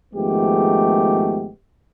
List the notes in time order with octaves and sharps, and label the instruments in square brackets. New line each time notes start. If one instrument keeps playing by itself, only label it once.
[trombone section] G#1 F3 G#3 A3 B3 G4